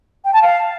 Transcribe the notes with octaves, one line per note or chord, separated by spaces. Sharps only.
G5
A5
F5